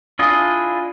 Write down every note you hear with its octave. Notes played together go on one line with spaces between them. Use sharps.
D4 E4 F4 G#4 D#5